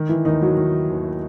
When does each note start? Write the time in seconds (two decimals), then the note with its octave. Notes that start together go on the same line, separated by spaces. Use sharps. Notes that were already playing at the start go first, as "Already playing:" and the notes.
Already playing: D#3
0.09 E3 E4
0.25 D#2 D#3 D#4
0.42 F#3 F#4
0.57 D#3
0.90 D#2